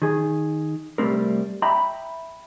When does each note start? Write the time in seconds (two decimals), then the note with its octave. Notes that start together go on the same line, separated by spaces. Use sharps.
0.02 D#3 G#4
0.98 C3 G3 A3 C4 A#4
1.62 E5 G5 A#5 B5